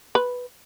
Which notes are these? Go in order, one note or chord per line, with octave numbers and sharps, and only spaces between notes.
B4